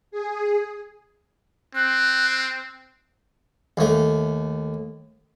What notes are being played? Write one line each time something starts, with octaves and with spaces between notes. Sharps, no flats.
G#4
C4 F#6
D#2 A3